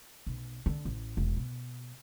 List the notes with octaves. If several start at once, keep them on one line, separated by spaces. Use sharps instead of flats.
B1
D3
A1
E1
B2